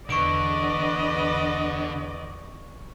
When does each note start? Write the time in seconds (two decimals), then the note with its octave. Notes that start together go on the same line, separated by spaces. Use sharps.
0.10 E2 D3 B4 D5 D#5 C#6 D7